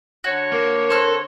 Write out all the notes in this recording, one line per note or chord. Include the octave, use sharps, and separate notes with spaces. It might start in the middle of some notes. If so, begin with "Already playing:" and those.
D3 F#4 C#5
A#3 A#4
C4 A4 F6 F#6